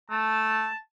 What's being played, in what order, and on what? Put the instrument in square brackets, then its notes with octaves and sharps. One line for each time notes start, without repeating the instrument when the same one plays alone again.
[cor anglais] A3 [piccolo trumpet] A5